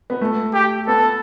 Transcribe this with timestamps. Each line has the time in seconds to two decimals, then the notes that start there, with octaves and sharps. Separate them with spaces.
0.10 B3
0.21 A3
0.54 G4
0.87 B3 A4